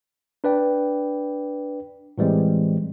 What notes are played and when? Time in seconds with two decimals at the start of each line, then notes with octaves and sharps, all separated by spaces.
0.44 D4 B4 D5 G5
2.18 A2 E3 G3 G#3 C4